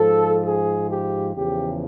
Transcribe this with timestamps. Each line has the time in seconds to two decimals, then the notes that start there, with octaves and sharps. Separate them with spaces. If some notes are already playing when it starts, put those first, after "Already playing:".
Already playing: G#2 F3 A4
0.45 G#4
0.89 G4
1.34 E2 C#3 F3 G4